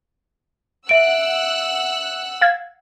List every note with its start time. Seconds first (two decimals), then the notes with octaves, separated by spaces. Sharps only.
0.89 E5 F#5 E6 F#6 D7
2.41 F5 G#6